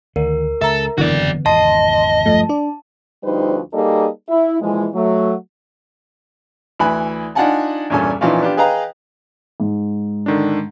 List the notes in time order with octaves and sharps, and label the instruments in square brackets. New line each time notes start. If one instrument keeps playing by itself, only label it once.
[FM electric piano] D2 [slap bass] D#3 [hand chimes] A#4
[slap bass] C#2 [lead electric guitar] A4 [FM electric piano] E5 A#5
[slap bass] F#1 F2 G#2 [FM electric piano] D3 E3 B3 [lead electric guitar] F#4 D5
[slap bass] G#1 E2 C#3 [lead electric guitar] D#5 [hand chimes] A5 [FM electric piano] C6
[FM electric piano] G2 F3 A3
D4 D5
[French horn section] D2 F3 G3 D#4 B4 C5
G3 A#3 D#4 G#4 A4 D5
E4
A#2 E3 F3 G#3
F#3 A3
[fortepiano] D2 E3 G#5 B5 F#6
D4 D#4 F4 F#5 G#5 A5
E2 G2 A#2 C#4 A4 G#5
A#2 E3 F3 C#4 D#4 F4
B3 D4 F4 G4
G#4 B4 D#5 F5 G5 A#5
[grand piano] G#2
[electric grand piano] D3 D#3 D4